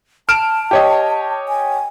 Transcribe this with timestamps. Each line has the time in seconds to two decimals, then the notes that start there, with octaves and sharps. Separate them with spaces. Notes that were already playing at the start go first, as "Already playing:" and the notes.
0.29 A5 F6 D7 E7
0.71 G4 C#5 D#5
1.48 G#5